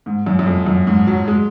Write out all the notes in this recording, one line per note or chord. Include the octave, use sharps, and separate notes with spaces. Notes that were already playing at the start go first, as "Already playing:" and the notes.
G#2
F#2
F#2
F2
F#2
G#2
F#3
G#3